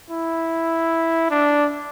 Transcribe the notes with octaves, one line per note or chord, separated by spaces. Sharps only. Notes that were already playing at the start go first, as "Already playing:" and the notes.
E4
D4